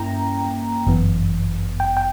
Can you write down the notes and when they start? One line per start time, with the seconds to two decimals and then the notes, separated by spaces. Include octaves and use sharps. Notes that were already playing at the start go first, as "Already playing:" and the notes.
Already playing: G2 A#3 C#4 E4 G5 A#5
0.87 G1 F#2 E3 B3
1.80 G5
1.97 G5